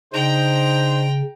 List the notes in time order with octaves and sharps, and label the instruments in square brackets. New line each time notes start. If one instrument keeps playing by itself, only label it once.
[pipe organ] C#3 [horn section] D4 D#4 C5 [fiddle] G5 A#5